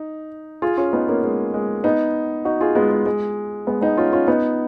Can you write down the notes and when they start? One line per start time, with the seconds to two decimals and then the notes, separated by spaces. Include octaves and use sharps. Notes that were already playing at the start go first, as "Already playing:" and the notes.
Already playing: D#4
0.62 F4 G#4
0.77 C#4 F4
0.93 B3 D#4
1.09 A#3 C#4
1.24 G#3
1.54 G#3
1.84 B3 D#4
2.45 D#4 F#4
2.61 F4 G#4
2.75 G#3 B3
2.91 G#3
3.06 G#3
3.67 G#3 B3
3.82 B3 D#4
3.97 C#4 F4
4.13 C#4 F4
4.28 B3 D#4